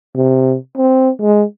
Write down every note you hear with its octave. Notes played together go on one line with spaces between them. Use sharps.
C3
C4
G#3